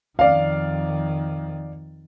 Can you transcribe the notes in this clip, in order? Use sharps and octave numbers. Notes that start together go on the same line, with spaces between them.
F2 D#3 D5 F5